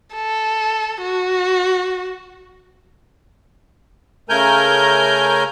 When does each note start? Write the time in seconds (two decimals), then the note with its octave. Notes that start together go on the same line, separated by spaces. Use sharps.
0.15 A4
1.02 F#4
4.29 C#3 A3 A#4 G#5 A#5 G6